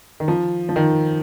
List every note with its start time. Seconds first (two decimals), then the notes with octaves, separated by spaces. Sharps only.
0.20 D#3
0.28 F3
0.69 F3
0.76 D#3